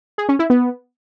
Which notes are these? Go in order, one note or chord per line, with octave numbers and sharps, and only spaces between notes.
G#4
C#4
E4
B3